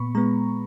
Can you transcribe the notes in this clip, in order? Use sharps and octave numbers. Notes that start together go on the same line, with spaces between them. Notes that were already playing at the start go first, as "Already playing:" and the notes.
Already playing: A#2 B3 B5 C#6
G#3 B3 A#5